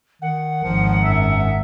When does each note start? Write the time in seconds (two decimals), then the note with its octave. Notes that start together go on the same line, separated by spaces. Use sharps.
0.22 D#3 F#5
0.63 G#1 D#3 F3
1.04 F#2 E5